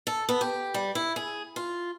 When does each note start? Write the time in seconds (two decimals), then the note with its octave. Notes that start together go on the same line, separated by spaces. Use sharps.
0.07 A4
0.29 B3
0.41 G4
0.74 G3
0.95 E4
1.16 G#4
1.56 F4